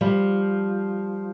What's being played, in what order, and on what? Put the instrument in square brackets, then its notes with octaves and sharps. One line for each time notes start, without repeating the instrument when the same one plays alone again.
[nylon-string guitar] F3 G3